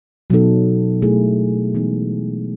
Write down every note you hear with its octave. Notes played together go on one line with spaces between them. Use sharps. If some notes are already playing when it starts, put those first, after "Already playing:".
B2 F#3 B3 D#4 A4
B2 A3 E4 G#4
E3 G#3 B3 D#4